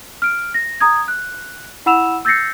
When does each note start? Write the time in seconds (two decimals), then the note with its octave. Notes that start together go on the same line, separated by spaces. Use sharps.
0.22 F6 D7
0.54 A#6
0.81 A#5 D#6 G#6
1.08 F#6
1.86 E4 F#5 B5 E6 E7 F7
2.25 E6 G6 A6 A#6 C7 C#7